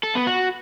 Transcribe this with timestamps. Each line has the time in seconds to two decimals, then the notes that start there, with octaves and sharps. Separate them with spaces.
0.03 A4
0.15 B3
0.27 F#4